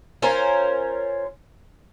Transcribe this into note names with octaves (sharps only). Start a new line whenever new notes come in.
C#4 F4 A#4 C5